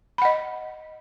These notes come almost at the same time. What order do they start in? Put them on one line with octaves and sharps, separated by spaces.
B5 F#5 D#5